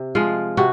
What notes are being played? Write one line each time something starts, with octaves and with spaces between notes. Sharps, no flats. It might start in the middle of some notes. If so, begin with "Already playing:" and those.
Already playing: C3
F3 G#3 F4
C3 F#4